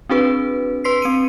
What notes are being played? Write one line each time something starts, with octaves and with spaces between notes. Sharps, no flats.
C4 D4 F#4 G#4 B4
B4 C6 B6 C7
C4 C#7 D#7